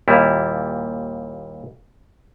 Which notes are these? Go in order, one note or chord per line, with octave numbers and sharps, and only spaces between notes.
D#2 A#2 G3 E4